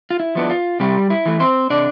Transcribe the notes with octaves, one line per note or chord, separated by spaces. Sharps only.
F4
E4
F3 B3 D4
F4
C3 G3 G4
E4
E3 A3
C4 C5
C3 D4 D5